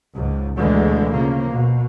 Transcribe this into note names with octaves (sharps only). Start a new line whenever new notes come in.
C#2 G#2
D2 B2 D3 E3 G#3
C#3 F3 A#3
B2